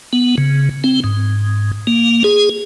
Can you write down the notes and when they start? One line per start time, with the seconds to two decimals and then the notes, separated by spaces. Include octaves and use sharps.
0.13 B3
0.38 C#3
0.84 C4
1.04 G#2
1.87 A#3
2.24 G#4